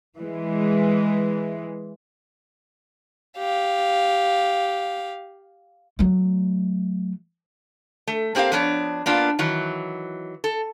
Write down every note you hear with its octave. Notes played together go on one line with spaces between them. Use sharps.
E3 G#3
G4 F5
F#3 A3
A3
A#3 C4 G4 A#4 F5
F3 B3 D4 C#5
A#3 B3 D4 F4
D#3 E3 F#3
A4